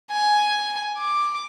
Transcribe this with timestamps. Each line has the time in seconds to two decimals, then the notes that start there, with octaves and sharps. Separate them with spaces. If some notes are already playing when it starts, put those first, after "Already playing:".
0.11 G#5
0.98 D6